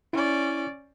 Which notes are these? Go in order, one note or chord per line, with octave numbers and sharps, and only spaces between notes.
C#4 E4 D5